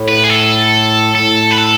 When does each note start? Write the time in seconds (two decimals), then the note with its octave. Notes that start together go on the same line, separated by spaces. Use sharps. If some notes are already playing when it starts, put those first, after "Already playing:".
Already playing: A2
0.08 B4
0.24 G#4
0.30 A4
1.15 A2 A4
1.51 B4
1.58 A4